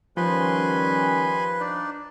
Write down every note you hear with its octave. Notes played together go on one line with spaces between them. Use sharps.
D#3 F3 G3 C#4 B4 G#5 B5 C6
D4 D#4 D5